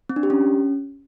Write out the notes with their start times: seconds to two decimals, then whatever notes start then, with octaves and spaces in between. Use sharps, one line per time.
0.10 C4
0.16 D4
0.23 G4
0.30 C#4